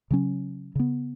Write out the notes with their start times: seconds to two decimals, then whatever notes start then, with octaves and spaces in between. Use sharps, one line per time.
0.11 C#3 F#3 C#4
0.75 C#3 B3